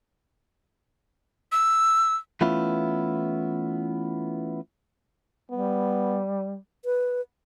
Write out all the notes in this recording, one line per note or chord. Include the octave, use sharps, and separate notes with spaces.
E6
E3 A3 B3 C#4 E4 F4
G3 B3
B4